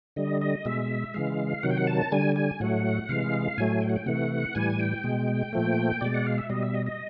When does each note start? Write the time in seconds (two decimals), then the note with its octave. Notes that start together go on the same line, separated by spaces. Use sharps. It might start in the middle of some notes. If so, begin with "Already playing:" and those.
0.16 D3 G3 D#5
0.41 D#5
0.65 B2 G#3 E5
1.14 C#3 E3 G#3 F5
1.63 C3 D#3 F#3 F#5
1.70 G5
1.77 F#5
1.87 A5
2.12 D3 G3 G#5
2.36 G#5
2.60 A2 F#3 A3 F#5
3.09 C3 E3 G#3 F5
3.58 A2 F#3 A3 G#5
3.82 G5
3.89 F#5
3.96 G5
4.06 C3 E3 A3 F#5
4.55 A2 E3 G3 G#5
4.80 G5
5.04 B2 G#3
5.53 A#2 F3 A3
6.01 B2 G#3 D5
6.14 F#5
6.26 F5
6.38 E5
6.50 B2 G3 D#5
6.63 E5
6.74 D#5
6.86 D#5